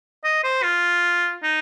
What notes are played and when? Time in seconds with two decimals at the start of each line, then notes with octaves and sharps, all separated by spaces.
0.24 D#5
0.44 C5
0.63 F4
1.43 D#4